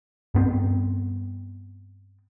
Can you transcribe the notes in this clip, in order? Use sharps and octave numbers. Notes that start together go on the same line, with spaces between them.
G2 B3 C4